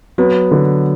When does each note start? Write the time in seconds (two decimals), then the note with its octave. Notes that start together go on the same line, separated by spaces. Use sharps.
0.18 F#3 B3
0.51 D3